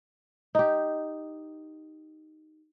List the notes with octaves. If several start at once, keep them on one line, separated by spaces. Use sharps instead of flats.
D#4 G4